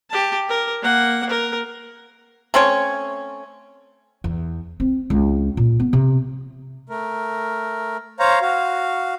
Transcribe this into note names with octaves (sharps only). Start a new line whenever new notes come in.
G4 A5
A#4
A#3 F#5
A#4
A3 C4 C#4 C#5
E2
C4
C#2
A#2
B3
C3
A3 A#4
C5 C#5 F5 A#5
F#4 F5